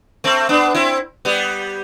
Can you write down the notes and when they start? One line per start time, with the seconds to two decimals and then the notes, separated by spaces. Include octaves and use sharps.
0.24 A3 C4
0.49 B3 D4
0.75 C4 E4
1.25 G3 B3